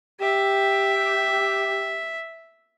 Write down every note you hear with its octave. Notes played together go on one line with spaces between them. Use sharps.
G4 E5